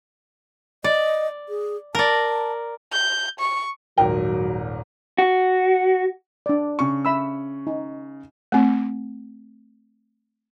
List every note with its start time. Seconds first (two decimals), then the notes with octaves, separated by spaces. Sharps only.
0.84 D5 D#5
1.49 G#4
1.95 A#4 D5 A5
2.93 G6
3.40 C#6
3.98 D#1 G#1 F#3 A#4 G5
5.18 F#4
6.46 D4 D5
6.79 C#3 C#6
7.05 E5 B5 E6
7.67 D#4
8.52 A3 C4